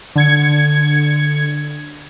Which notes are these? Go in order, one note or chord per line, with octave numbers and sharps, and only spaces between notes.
D3 G#6 C#7